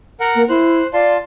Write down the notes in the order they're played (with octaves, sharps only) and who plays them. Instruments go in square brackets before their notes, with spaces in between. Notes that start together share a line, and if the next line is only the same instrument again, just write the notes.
[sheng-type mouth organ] A#4 F#5
[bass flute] A#3
[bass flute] E4 [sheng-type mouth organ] C5 F#6
[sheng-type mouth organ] F4 A5 C6 [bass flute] D5